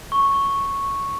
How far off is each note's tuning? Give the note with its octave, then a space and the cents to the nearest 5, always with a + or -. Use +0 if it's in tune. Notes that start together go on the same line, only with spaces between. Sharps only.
C#6 -5